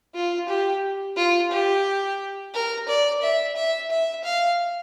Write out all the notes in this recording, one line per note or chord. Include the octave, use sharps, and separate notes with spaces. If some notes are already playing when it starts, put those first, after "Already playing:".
F4
G4
F4
G4
A#4
D5
E5
E5
E5
F5